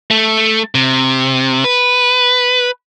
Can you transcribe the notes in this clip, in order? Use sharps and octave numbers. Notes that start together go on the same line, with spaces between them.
A3
C3
B4